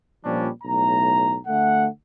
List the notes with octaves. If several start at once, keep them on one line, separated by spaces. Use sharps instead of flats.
A#2 F3 G3 C#4 D4
B1 A2 A#5
D2 A3 F#5